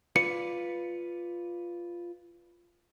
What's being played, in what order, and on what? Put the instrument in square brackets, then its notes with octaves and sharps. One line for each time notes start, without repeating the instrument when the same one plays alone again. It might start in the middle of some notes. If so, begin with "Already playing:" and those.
[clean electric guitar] F4 B4 D5 [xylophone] C#7